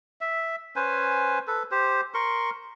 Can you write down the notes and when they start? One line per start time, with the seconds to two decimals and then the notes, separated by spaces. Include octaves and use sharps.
0.21 E5
0.76 C#4 B4 C5 G#5
1.47 A4 B4
1.71 G4 C5
2.14 A#4 C6 C#6